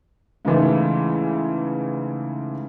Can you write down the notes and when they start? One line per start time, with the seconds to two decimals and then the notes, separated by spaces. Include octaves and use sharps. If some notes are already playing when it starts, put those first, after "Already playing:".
0.45 G#2 C#3 E3 A3